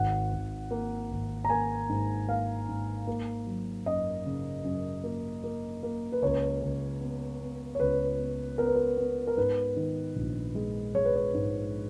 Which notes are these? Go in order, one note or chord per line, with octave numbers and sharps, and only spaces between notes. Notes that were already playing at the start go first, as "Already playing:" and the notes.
Already playing: G#1 F#5
G#1
A#3
G#1
A#5
A#3 G#5
G#2
A#3 F5
G#2
A#3
F#3
F#2 D#5
C#3
F#2
A#3
A#3
A#3
B4
C#2 C#5
C#2
B3
B3
C#5
C#2 B4
B3
B3 A#4
B4
A#4
B3
A#4
G#2 B4
D#3
A#1
G#3
G#3 C#5
B4
C#5
G#2